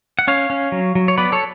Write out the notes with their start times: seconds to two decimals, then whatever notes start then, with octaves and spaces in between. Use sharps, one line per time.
0.19 F#5
0.28 C#4 C#5 F5
0.50 C#4
0.72 F#3
0.95 F#3
1.08 C#5
1.18 B3 B4 D5
1.32 A4 C#5